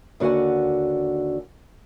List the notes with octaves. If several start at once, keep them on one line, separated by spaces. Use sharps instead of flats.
D#2 D3 F#4 F#5 G#5